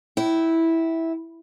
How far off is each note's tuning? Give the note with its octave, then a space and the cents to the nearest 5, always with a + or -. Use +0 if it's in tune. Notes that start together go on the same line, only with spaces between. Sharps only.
E4 -10 G5 -25